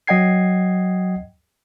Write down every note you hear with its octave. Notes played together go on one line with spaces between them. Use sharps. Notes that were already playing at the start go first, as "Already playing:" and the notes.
F#3 D#5 F#5 G5 G#6 C7